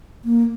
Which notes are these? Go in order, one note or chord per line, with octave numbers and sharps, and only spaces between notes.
A#3